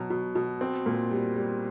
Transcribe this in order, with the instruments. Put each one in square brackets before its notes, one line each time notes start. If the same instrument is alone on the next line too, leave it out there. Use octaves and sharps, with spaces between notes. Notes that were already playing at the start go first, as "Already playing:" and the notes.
Already playing: [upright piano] B2 F#3
B2
B2
C4
A#2
G3
G3